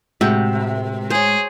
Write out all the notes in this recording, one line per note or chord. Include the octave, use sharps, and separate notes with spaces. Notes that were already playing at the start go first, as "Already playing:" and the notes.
A2 C3 G#3 F#4 F#5 G5
G#4 C5 C#5